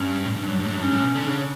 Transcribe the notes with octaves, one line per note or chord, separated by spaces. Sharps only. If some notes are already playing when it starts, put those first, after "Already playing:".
Already playing: G2 C#4
A2
G2 D4
F#2
G2
A2
G2
F#2
G2 C#4
A2
B2
D3
C#3 D4